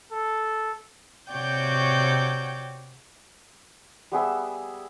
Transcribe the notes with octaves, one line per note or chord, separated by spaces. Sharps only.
A4
C3 F#4 C#5 D5 G5 G6
G3 B3 G#4 E5